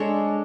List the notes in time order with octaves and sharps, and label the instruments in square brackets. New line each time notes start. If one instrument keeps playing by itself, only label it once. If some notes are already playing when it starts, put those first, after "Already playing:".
Already playing: [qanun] G#3 D4 A4 C#5